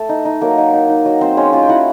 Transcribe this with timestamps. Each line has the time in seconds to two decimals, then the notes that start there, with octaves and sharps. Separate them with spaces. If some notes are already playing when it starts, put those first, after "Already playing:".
Already playing: A3 A4
0.09 D#4
0.25 D#4
0.41 F#3 A#3 A#4
0.58 D#4
0.74 D#4
0.89 D#4
1.05 F#3
1.21 F#3 C4 C5
1.37 G#3 C#4 C#5
1.53 C#4 F4 F5
1.62 G5
1.69 E4 F#4 F#5